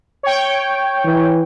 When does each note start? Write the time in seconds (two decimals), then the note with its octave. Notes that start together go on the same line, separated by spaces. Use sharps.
0.23 C#5 G5
1.05 E3